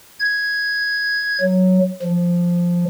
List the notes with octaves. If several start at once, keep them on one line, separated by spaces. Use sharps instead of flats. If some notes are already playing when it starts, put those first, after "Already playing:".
G#6
F#3
F3